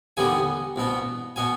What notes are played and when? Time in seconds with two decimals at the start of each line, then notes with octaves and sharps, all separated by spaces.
0.17 D#2 D3 G3 B3 G#5
0.76 C2 B2 B3
1.36 B2 B3 G#5